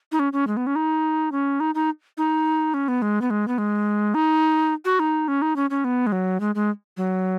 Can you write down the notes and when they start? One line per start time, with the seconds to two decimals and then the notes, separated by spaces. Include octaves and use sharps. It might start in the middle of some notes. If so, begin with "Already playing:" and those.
0.12 D#4
0.19 C#4
0.33 C#4
0.47 G#3
0.57 B3
0.67 C#4
0.76 D#4
1.32 C#4
1.60 D#4
1.75 D#4
2.17 D#4
2.74 C#4
2.88 B3
3.02 G#3
3.22 B3
3.30 G#3
3.48 B3
3.58 G#3
4.14 D#4
4.85 F#4
5.00 D#4
5.28 C#4
5.42 D#4
5.56 C#4
5.70 C#4
5.84 B3
6.07 G#3
6.12 F#3
6.40 G#3
6.55 G#3
6.97 F#3